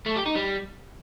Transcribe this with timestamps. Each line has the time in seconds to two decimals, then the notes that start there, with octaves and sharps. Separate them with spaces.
0.06 A3
0.16 G4
0.26 D#4
0.35 G3